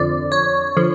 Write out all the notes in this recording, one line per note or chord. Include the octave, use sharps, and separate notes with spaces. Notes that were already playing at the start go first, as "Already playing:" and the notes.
Already playing: F2 D3 F3 D5
C#5
D3 F3